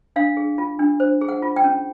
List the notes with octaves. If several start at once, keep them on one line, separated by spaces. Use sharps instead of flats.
D4 F5
G#4
F4
D4
C5
G#4
F#5
F4
G5
C#4